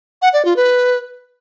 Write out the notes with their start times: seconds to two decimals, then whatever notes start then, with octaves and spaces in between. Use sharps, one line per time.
0.22 F#5
0.33 D5
0.45 F4
0.56 B4